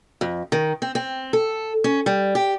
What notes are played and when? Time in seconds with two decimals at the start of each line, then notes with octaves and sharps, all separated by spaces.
0.21 F2
0.52 D#3
0.82 C4
0.95 C4
1.33 A4
1.84 C#4
2.06 G3
2.35 G4